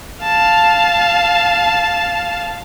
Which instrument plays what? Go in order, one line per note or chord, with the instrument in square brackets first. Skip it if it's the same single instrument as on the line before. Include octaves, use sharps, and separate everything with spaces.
[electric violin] F5 A5